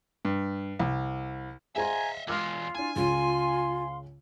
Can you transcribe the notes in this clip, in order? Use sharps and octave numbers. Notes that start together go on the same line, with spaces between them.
G2
C2
G#4 C5 D#5 E5 G#5 A#5 C6 G#6
E3 G#3 F4 D6 E6 F6
D4 E4 G#5
C#2 C#3 F4 F5 C6